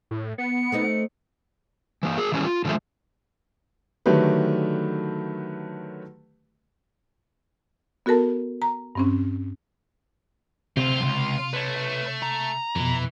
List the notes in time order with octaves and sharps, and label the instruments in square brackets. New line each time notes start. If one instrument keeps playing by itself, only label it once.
[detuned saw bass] A2
[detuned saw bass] B3 [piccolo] C#7
[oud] A3 C4 D#4
[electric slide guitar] E3 A#3
G#4 A#4
D#3 E3 G3 C#4
F4
D3 D#3 F3 G#3 A3
[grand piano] D3 D#3 F#3 A3 G4 B4
[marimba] B3 F#4 A4 A#4 A5
A#5
G2 C4 C#4
[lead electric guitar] D2 C4 [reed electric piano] C3 [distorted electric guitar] F4
[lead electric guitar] C#2 F#2
[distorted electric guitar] A3 [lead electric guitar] B4 C#5
[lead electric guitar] A#5
[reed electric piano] F2 B2 [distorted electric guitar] E3